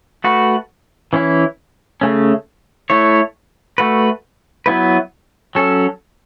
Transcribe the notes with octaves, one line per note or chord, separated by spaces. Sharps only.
A3 F#4 B4
E3 C#4 E4
C#3 A3 C#4
A3 E4 C#5
A3 F#4 B4
F#3 B3 E4 B4
F#3 C#4 A4